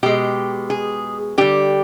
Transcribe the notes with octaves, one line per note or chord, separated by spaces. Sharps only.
B2 G#3 G4
G#4
D3 G3 G4